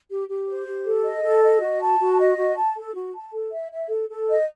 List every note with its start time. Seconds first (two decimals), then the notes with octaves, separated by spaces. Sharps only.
0.09 G4
0.28 G4
0.47 C5
0.66 G4
0.85 A4
1.03 D#5
1.23 A4
1.42 D#5
1.61 F#4
1.81 A5
2.00 F#4
2.18 D#5
2.38 F#4
2.56 A5
2.75 A4
2.95 F#4
3.14 A5
3.32 A4
3.51 E5
3.70 E5
3.89 A4
4.09 A4
4.28 D#5